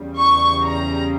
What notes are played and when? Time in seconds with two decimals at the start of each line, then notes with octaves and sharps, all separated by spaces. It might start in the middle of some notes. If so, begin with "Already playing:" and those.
Already playing: E2 C#3 G3
0.17 C#6
0.64 A#5